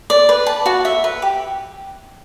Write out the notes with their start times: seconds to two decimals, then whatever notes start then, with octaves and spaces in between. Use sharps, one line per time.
0.10 D5
0.29 B4
0.47 A5
0.66 F#4
0.85 E5
1.04 B4
1.22 G4